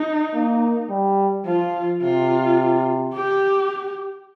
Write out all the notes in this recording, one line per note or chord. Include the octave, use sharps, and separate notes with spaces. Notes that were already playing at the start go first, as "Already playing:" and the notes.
Already playing: D#4
A#3
G3
F3 F4
C3 F4
G4